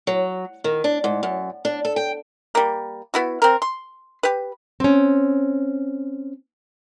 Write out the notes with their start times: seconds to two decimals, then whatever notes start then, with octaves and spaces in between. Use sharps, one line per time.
0.07 F#3
0.64 D#3
0.84 D4
1.04 G#2
1.23 F#2
1.65 D4
1.85 A4
1.96 G5
2.55 G3 A#3
3.14 B3 E4 F#4
3.42 C4 A#4
3.62 C6
4.23 G4 B4
4.80 C4 C#4